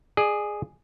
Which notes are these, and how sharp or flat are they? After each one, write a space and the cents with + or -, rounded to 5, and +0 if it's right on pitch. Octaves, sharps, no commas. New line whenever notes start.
G#4 +0 D5 +35